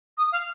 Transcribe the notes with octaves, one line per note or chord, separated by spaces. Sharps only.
D#6
F5